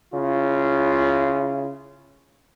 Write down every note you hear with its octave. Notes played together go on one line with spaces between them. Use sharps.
C#3 E4 F4